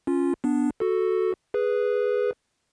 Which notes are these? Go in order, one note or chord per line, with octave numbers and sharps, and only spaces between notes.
C#4 F4
B3 D4
F#4 A4
G#4 B4